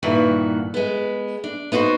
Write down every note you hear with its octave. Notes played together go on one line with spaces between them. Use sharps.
G2 A#2 D#3 E3 F#4
G#3 B3
D4
B3 D#4 E4 F#4 C5